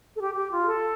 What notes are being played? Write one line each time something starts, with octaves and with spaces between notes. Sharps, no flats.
A4
G4
G4
F4
G4
A4